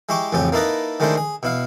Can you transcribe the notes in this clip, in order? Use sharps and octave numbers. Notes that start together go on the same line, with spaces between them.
G#3 E4 G4 C#6 D6
A1 F2 C#3 G4 G#5
A#3 D#4 E4 A4 B4 D#5
D#3 G#3 A3 D4 E4 C5
G#4
B2 E4 F5